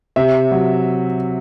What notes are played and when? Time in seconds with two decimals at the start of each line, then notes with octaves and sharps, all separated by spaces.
0.16 C3 E5
0.52 F#3